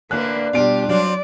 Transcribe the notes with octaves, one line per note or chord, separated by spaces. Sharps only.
A2 D3 A#3 D4 B4 F#6
B2 G3 D4 F4 G4 D5 D7
F#3 C4 D4 F4 D5